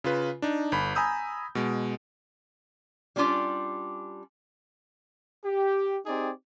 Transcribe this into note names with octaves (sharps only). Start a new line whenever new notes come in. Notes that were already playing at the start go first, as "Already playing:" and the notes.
C#3 F4 B4
D4 D#4
G1 B5
G#5 A#5 B5 D#6 E6 G6
B2 G#3
G3 C#4 D4 F4 G4
G4
C4 D#4 G4 G#4 D5